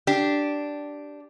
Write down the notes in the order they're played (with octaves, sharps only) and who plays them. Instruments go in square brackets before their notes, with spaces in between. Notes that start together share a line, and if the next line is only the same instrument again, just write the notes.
[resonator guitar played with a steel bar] D4 G4